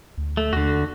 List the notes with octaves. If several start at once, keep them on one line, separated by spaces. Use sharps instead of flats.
D2
A3
D#2 D3 F#4